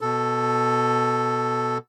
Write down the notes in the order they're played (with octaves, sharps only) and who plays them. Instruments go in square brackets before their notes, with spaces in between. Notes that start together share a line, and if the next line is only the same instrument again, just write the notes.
[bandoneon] B2 A4